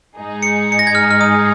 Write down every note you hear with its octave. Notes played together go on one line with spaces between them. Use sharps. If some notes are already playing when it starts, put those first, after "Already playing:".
G#2 G#3 D#4 G#4
C#7
C#7
A#6
G#6
F6
F6
D#6